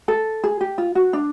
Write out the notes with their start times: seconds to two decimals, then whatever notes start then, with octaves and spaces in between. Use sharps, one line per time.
0.08 A4
0.44 G#4
0.61 G4
0.78 F4
0.95 F#4
1.13 D4